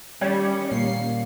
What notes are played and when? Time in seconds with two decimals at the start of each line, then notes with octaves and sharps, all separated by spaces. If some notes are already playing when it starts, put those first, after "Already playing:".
0.21 D#3 G3 C#4 C#5 G#6
0.71 A#2 G3 A#3 C7